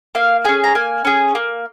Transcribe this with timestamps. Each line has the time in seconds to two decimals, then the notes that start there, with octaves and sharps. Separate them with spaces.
0.15 A#3 F5
0.45 C#4 G#4 G#5
0.64 A#5
0.75 A#3 G#5
1.05 C#4 G#4
1.35 A#3